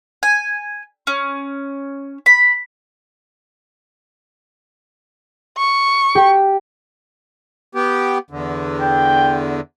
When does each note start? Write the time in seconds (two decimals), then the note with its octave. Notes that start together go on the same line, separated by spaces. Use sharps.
0.23 G#5
1.07 C#4
2.26 B5
5.57 C#6
6.15 G4 G5
7.75 B3 G4
8.30 E2 D3
8.81 G5